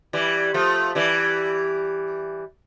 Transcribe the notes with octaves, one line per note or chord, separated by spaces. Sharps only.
E3 G3
F3 A3
E3 G3